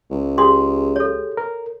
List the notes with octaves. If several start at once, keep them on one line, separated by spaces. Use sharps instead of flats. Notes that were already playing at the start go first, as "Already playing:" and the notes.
C#2
G4 G#4 C6
A4 C#5
A#4